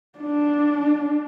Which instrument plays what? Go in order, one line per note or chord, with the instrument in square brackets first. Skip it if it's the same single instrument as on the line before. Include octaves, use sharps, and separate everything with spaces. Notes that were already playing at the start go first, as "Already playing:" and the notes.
[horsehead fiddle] D4